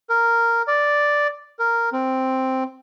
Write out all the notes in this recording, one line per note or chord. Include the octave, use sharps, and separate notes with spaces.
A#4
D5
A#4
C4